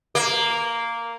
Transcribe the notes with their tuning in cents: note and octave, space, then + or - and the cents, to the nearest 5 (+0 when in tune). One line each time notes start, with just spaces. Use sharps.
A#3 -5